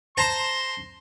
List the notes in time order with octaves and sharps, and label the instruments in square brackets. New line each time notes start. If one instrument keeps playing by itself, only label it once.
[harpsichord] C5 A5 A#5 [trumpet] C6